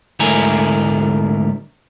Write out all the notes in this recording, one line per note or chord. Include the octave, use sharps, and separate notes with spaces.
D2 G#2 A3 E4 A#4 G#5